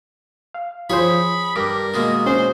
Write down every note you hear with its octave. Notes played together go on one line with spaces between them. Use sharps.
F5
F3 F4 G#4 C5 C#5 B5
G2 A#4 D6
B2 G#3 A#3
C#4 C5